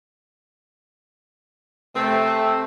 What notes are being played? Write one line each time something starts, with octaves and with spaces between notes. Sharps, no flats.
C3 A3 C4